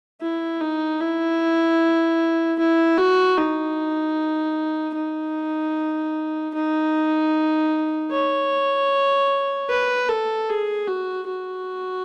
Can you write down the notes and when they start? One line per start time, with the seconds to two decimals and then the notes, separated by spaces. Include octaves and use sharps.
0.21 E4
0.61 D#4
1.00 E4
2.59 E4
2.97 F#4
3.38 D#4
4.95 D#4
6.54 D#4
8.11 C#5
9.69 B4
10.09 A4
10.49 G#4
10.88 F#4
11.28 F#4